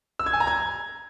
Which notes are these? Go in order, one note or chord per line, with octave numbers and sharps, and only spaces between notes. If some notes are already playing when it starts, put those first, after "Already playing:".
E6
G#6
G#5
A#5
G#6